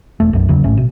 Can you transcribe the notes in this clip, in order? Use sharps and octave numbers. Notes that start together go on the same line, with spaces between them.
E1 A3
B1 F#2
F#1 E2 C#3 F#3
A1 G#2 A3 C#4
B2